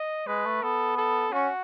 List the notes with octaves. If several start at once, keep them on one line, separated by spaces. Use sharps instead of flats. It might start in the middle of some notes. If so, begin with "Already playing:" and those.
Already playing: D#5
G#3 B4
A3
B3 A4
A4
C#4 F#4